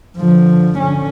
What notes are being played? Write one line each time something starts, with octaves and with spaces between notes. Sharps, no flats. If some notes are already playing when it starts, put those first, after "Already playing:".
D3 F3
D3 C#4